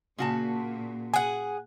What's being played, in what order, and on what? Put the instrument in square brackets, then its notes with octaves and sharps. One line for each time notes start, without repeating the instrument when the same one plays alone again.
[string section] A#2 [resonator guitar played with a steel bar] C#3 F#4 A5
[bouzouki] G#4 F#5 [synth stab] G#5